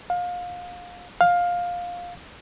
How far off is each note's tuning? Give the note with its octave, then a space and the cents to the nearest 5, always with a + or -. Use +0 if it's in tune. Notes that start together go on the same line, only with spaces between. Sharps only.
F5 +30
F5 +15